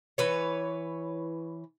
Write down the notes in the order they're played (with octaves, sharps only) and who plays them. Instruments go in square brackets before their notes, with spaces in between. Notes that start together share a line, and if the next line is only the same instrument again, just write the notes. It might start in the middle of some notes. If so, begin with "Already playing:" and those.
[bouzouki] E3 B4 C#5